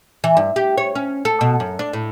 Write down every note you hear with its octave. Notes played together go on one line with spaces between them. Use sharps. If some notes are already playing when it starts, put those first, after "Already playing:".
E3
G2
G4
C#5
C#4
A4
B2
F#2
D4
A2